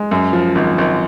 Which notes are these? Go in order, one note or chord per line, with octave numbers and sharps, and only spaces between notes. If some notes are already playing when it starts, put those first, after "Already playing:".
Already playing: G#3
F#2
F3
G#1
G#1